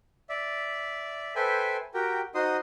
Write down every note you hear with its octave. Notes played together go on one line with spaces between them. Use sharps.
D5 E5
A4 B4 C5 E5 G5 G#5
F#4 G4 A#4 G5
D#4 F#4 C5 D#5 C6 D#6